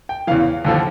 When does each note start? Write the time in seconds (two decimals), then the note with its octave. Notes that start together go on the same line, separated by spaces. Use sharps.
0.09 G5
0.27 E2 C#3 E3 F5
0.65 D#2 D3 F3